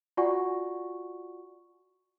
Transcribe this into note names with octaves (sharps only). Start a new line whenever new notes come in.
F4 F#4 D5 F#5 G#5 C#6